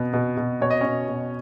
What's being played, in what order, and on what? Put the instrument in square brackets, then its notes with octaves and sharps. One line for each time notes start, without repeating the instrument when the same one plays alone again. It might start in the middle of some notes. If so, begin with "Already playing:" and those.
Already playing: [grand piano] B2 B3
B2
B2
B2 C#5
D#5
B2 C#4 C#5
B2